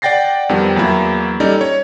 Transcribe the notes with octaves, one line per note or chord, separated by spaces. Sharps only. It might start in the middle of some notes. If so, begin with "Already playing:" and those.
D5 F#5 G5 A6 A#6 C7
F2 D#3 G3 B3
E2 F#3 A#3 E4
G3 C#4 D#4 A4 C#5 D5
C#5